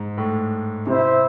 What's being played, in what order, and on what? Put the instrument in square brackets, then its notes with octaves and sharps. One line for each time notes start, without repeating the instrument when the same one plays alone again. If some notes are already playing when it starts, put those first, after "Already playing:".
Already playing: [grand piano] G#2
A2
[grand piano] C3 [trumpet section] E4 C5 E5